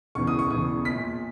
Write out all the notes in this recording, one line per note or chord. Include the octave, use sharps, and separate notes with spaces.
E1 E2 C#3 E3 C#6
D#6
C#6
E1 E2 C#3 E3 D#6
A#1 A#2 B6